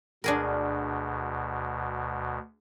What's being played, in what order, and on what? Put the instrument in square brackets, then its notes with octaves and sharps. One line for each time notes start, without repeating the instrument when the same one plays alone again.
[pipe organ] D2 B2 [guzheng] D4 G#4 A#4